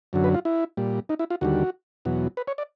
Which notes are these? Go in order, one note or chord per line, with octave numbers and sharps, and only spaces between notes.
F#2 D3 F#3
B4
F4
E4
A#2 G3
D#4
E4
F4
D#2 D3 G3 F#4
E2 B2 F#3
B4
C#5
D5